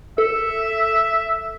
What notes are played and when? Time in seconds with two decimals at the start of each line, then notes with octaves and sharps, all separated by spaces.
0.18 A4 E5